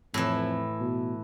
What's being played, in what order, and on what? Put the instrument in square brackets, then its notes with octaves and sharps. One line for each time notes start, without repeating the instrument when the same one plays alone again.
[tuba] F2 [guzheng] A2 E3
[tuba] B2